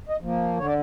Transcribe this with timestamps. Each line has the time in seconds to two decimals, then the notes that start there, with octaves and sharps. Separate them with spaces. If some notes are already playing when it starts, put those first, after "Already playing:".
0.09 D#5
0.21 F3 A#3
0.57 D3 C#5
0.66 D5